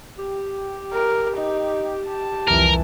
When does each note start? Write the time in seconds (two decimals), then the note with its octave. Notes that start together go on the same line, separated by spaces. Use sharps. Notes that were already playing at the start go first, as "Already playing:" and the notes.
0.18 G4
0.93 A#4
1.37 D#4
2.08 A5
2.47 C2 F2 E3 A#4